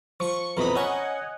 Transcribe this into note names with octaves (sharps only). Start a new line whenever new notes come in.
F3 C#6
F2 B2 E3 A#5 B5 D#6
C#4 D#5 F#5 G#5 C#6